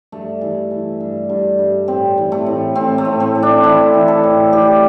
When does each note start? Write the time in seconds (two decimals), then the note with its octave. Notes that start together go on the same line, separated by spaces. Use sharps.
0.12 G2 A3
0.41 E3
0.71 E3
1.00 G2
1.29 G2
1.59 G2
1.88 A2 C4
2.18 E3
2.32 A3
2.46 A2
2.75 A2 C4
2.98 A3
3.05 A2
3.20 C4
3.35 A2
3.43 D4
3.64 E3 E4
3.94 E3
4.08 A4
4.23 A2
4.52 E3 G4